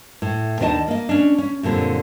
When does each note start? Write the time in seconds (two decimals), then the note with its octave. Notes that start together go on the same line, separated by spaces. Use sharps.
0.22 A2
0.59 D#2 D#3 D4 B4 D#5 A5
0.88 A#3 D#5
1.09 C#4 D4
1.38 C#4
1.63 F#2 A#2 D3 G3 C4